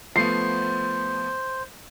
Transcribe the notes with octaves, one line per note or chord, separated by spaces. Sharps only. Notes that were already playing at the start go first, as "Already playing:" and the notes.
F3 A3 B3 C5 C7